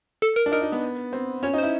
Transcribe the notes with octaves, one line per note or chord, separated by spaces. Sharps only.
A4
A#4
D4
D#4 A#4
D#4
B3
C4
C#4 C#5
D#4
E4 C5